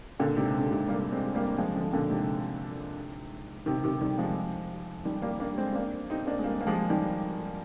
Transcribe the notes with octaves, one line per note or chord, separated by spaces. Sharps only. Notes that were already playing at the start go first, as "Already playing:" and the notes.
A#2 D3
G#2 C3
D3
G#2 C3
G3 A#3
G#3 C4
G3 A#3
A#3
F3 G#3
D3 F3
A#2 D3
G#2 C3
C3 D#3
C3 D#3
D#3 G3
F3 G#3
D#3 G3
G3 A#3
A#3 D4
G#3 C4
A#3 D4
C4 D#4
A#3 D4
G#3
G3 A#3
A#3
F3 G#3
D#3 G3